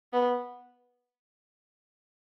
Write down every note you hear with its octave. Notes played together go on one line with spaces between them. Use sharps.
B3